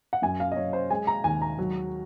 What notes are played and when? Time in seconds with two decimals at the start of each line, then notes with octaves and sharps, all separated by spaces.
0.13 F#5
0.22 F#2 G#5
0.40 F5
0.52 D#5
0.56 F#2 C#5
0.73 C5
0.90 G#3 G#5
1.07 A#5
1.24 D#2 G#5
1.42 A#5
1.59 F#3